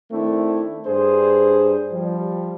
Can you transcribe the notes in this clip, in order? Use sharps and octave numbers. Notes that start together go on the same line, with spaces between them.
D#3 A3 C4 D4 E4
G2 D4 G#4 C5
F3 G3